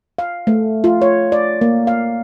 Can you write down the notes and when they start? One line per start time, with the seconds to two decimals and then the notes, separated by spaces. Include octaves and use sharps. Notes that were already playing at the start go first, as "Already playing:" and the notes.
0.18 F5
0.47 A3
0.84 F4
1.02 C#5
1.32 D5
1.61 A#3
1.87 F5